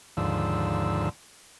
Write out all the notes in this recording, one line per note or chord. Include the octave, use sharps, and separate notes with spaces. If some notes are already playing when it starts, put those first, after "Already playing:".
D#2 G#2 D3 F3 E6